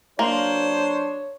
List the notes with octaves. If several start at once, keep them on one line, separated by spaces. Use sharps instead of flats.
F#3 A#3 D4 C5 C#5